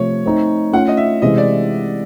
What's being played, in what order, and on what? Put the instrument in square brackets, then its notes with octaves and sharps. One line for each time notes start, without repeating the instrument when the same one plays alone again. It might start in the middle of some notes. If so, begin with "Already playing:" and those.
Already playing: [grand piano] C3 F3 A3 [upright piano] C#5
[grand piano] A3 C4 D#4
[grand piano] A3 C#4 F4 [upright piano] F#5
[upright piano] D#5
E5
[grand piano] C3 E3 G#3 [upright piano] D#5
[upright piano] D5